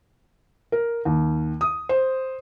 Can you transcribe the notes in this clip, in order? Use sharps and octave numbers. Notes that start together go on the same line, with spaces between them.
A#4
D#2
D#6
C5